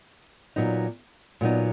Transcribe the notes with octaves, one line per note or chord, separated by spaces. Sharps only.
A#2 F#3 B3 D#4
A#2 F#3 B3 D#4